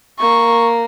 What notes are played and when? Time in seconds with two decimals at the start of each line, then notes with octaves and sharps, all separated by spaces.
0.20 A#3 C#6